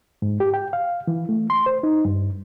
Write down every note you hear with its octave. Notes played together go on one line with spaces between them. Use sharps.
G#2
G4
G5
F5
E3
A3
C6
C5
D#4
G2